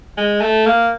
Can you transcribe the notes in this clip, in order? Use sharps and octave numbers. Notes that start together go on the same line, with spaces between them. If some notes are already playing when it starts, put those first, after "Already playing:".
G#3
A3
A#3